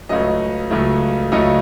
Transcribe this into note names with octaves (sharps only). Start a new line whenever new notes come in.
C#2 C#3 F#3 A3 D#5
C#2 C#3 F#3 A3
C#2 C#3 F#3 A3 D#5